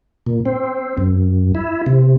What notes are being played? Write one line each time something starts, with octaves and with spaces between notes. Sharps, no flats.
A#2
C4
F#2
E4
C3